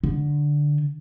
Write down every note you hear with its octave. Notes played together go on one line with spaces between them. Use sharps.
D3